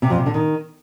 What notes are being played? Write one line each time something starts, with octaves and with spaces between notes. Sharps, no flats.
C3
F2
C3
D3
D#3